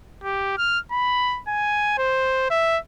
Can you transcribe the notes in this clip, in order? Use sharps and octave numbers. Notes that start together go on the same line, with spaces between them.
G4
F6
B5
G#5
C5
E5